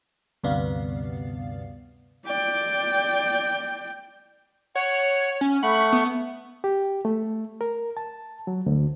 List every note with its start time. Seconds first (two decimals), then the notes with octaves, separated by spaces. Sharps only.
0.44 D2 G2 C3 B3 D5 F5
2.27 D5 G5
4.75 C#5 F#5
5.41 C#4
5.63 A3 F#5 B5 C#6
5.92 B3
6.64 G4
7.05 A3
7.61 A#4
7.97 A5
8.47 F#3
8.66 D2